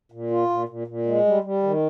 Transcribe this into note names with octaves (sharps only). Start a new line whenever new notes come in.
A#2
F4
A#2
A#2
A#2
G#3
G3
G3
D#3